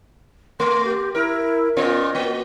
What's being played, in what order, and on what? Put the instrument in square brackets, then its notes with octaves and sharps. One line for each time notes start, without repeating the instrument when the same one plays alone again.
[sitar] A3 [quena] C6
[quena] G4
[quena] E4 [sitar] A#4
[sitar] A#2 B3 F4 [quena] D#5
[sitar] A#3 F#4